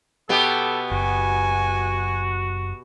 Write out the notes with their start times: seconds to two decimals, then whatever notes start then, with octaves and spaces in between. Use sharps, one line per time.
0.29 B2 B3 G4 A4
0.91 F#1 F#4 G#5